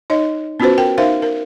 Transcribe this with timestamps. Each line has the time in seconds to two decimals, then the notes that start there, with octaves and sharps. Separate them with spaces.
0.10 D#4 C#5 D#5
0.60 B3 C#4 F4 F#4 B4 C5
0.78 A#4 G5
0.98 D#4 A#4 C5 E5 F5
1.22 A#4